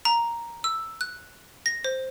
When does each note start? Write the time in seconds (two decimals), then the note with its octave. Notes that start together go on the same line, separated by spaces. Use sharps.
0.05 A#5
0.64 E6
1.01 F#6
1.66 A#6
1.84 C5